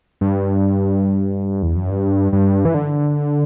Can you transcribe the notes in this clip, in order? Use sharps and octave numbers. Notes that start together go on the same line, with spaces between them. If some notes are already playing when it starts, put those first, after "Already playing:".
G2
E2
F#2
G2
G2
E3
D3